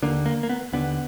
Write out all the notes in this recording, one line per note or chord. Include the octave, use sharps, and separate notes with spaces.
D#2 D3 A#3
A#3
A#3
B3
D#2 D3 B3